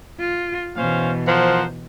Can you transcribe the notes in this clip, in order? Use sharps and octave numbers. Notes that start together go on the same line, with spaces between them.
F4
B2 E3 C#4 C5 F5
F3 A#4 C5 F#5